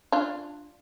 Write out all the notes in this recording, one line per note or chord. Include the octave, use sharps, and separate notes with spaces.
D4 F4